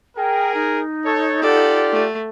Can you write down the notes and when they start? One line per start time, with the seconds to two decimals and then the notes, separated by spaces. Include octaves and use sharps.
0.17 G#4 A#4 G5
0.54 D#4
1.05 A4 C#5
1.42 F4 G4 A4 D5 F#5
1.92 A3